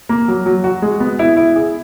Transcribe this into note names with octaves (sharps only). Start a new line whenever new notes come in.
A#3
F#3
F#3
F#4
G#3
B3
E4
E4
G#4